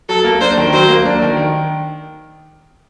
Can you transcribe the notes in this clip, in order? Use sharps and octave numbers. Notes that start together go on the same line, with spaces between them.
F#3 A4
A#3
D4 C5
D#3
F#3 C5
A#3
D4
D#3
D#3